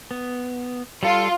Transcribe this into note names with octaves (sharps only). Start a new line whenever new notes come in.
B3
G3 F4 A4